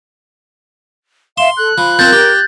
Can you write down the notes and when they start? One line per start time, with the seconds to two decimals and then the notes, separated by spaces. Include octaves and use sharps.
1.38 E5 F5 C6 E7
1.57 A4 F#6
1.78 F3 B5
1.99 F3 C4 A#4 G6 A6
2.13 G4